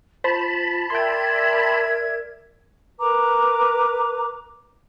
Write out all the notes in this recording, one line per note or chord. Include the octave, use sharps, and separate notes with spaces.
F4 C5 A5 B5
A#4 D5 E5 G5 C6 G#6
A#4 B4 A#5 D6